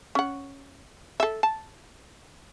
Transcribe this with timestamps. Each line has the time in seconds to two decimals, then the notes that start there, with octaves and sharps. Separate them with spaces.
0.15 C#4 F#5
1.20 A4 E5
1.43 A5